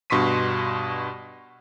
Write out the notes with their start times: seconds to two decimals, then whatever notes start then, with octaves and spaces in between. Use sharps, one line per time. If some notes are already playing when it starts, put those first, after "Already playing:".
0.10 G2 B2 C6 C#6 B6 D#7